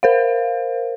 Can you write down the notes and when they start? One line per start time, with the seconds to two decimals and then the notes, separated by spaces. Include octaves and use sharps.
0.03 A#4 C5 F5